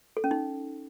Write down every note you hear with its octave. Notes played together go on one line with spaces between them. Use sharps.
A4
C#4
D#4